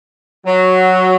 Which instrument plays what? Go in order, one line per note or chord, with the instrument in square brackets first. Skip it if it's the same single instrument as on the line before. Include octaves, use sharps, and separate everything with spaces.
[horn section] F#3